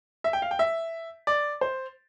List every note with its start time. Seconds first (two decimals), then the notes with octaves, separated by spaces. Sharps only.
0.24 E5
0.33 G5
0.42 F5
0.51 G5
0.59 E5
1.27 D5
1.61 C5